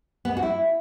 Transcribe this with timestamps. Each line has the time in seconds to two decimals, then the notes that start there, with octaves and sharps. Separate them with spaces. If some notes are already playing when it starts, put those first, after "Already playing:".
0.25 B3
0.31 G#3
0.37 F#4
0.43 E4